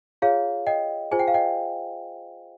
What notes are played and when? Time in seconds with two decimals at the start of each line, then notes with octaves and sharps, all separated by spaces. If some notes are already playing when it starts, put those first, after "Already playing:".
0.22 F4 G#4 C#5 F5
0.67 D#5 G5
1.11 F4 G#4 C5 G#5
1.19 G5
1.28 F5
1.34 D#5 G5